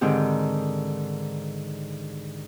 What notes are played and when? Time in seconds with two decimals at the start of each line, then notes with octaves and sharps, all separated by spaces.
0.01 G#2 D3 D#3 C4 G4